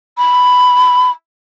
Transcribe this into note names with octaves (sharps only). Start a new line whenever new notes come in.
B5